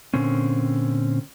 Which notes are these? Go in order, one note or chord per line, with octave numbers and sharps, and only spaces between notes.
A#2 D3 C4 C#4